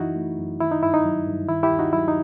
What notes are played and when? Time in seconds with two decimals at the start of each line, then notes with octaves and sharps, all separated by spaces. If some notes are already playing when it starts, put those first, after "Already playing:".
Already playing: F#2 E3 D#4 E4 F#4
0.16 A3
0.38 F#2
0.60 D#3 E4
0.71 D#4
0.82 G2 E4
0.94 D#4
1.05 F#3
1.27 G2
1.48 D#3 E4
1.63 E4 G4
1.70 D#2
1.79 D#4 F#4
1.93 F#3 E4
2.08 D#4